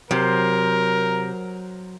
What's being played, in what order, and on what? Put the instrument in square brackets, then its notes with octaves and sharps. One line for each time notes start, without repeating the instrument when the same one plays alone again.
[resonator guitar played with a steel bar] C3 [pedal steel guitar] F#3 C5 [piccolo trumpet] A#4